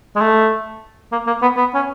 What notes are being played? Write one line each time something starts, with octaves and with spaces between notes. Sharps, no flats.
G#3
A3
A#3
A#3
B3
B3
C#4